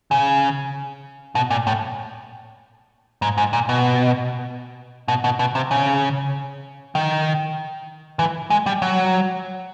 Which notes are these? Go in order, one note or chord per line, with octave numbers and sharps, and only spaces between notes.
C#3
B2
A#2
A2
G#2
G#2
A#2
B2
B2
B2
B2
C3
C#3
D#3
E3
G#3
G3
F#3